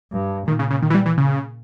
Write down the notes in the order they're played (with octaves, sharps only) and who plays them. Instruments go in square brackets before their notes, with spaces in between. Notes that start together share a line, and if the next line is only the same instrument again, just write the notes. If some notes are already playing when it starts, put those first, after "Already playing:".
[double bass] G2
[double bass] A#2 [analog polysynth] D#3
[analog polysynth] C#3
C#3
D#3
E3
G3
E3
C#3